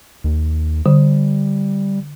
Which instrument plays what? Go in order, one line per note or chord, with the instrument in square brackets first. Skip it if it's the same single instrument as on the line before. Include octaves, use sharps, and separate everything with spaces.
[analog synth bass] D#2
[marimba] D3 [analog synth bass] G3